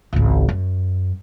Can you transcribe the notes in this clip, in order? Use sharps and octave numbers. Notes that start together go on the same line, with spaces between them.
G#1 C#2
F#2